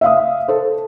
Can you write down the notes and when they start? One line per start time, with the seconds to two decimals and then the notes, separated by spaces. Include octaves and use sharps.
0.01 E5 F5 D#6
0.48 A4 C5